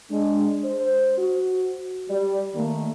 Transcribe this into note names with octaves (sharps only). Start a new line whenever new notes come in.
G#3 D4
C5
F#4
G3 D5
D#3 A3 A#3